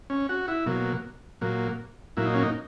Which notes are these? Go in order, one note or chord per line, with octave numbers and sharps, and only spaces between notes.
C#4
F#4
E4
B2 F#3 A#3
A#2 F#3 A#3
A#2 F#3 A#3 E4
D#4
C#4
D#4